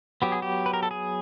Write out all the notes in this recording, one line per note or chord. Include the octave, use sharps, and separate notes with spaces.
F#3 B3 G4
G#4
G4
B4
A#4
A4
G#4